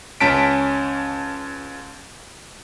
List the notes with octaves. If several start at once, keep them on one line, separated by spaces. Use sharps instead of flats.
C#2 C#4 A5 B6 D7